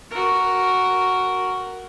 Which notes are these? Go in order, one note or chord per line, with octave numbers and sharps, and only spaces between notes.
F#4 A#4